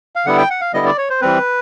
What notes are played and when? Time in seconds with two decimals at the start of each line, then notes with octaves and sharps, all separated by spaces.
0.16 F5
0.26 D3 G3 B3 E4 F#5
0.38 G5
0.50 F#5
0.61 F5
0.74 D3 G3 B3 E4 D#5
0.86 D5
0.98 C#5
1.10 C5
1.21 E3 G3 C4 B4